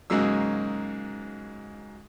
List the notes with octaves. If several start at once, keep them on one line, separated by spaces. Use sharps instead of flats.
G#2 C#3 F#3 G#3 A#3 E6